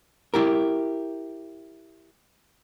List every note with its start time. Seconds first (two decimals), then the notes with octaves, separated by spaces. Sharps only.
0.34 E4 G4 A#4